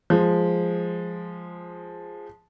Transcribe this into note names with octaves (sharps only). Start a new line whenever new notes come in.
F3 G#3